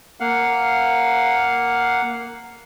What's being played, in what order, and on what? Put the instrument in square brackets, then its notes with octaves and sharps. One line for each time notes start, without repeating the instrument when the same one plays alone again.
[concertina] A#3 F5 F#5